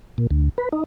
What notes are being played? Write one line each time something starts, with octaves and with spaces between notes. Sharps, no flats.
A#2
D2
B4
D#4